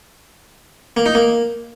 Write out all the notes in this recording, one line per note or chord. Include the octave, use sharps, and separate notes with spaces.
A#3
D#4
A#3